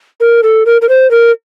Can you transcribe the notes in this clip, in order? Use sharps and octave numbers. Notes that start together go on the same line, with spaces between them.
A#4
A4
A#4
A#4
C5
A#4